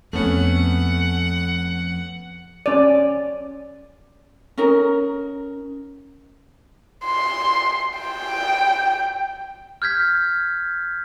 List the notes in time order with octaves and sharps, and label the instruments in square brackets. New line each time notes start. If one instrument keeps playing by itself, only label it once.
[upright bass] F2 [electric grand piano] A3 B3 C#4 [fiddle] F#5
[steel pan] C#4 D5
[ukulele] C#4 D#4 A#4
[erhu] C6
G5
[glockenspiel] F6 G6 G#6 B6